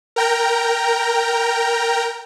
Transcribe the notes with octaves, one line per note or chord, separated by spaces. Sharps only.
A#4 G5 A#5